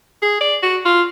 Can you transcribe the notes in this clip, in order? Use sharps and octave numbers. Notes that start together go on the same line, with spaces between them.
G#4
D5
F#4
F4